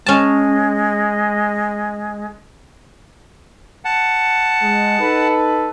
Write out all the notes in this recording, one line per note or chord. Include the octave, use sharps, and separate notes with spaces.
G#3 C#4 A5
F#5 A5
G#3
D#4 A4 B4